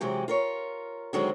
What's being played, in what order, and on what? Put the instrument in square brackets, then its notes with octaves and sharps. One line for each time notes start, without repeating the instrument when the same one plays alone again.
[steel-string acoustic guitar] C3 E3 F#3 G#3 G4
F4 A#4 C#5
D3 D#3 F#3 G#3 C4 F#4